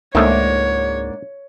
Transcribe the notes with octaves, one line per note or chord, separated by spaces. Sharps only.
C#2 G#2 D#3 A3 A#3 D4 C#5